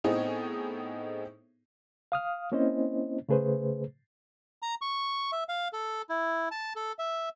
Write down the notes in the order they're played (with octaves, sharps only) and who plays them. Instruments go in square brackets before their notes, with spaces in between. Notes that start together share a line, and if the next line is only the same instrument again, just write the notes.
[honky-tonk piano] A2 B3 C4 D#4 G#4
[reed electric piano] F5 D#6 F6
A#3 C4 C#4 E4 C5 D#5
C#3 A3 G#4 B4 C5
[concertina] A#5
C#6
E5
F5
A4
E4
A5
A4
E5